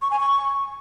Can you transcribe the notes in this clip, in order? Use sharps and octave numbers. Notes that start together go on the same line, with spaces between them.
C#6
G#5
C#6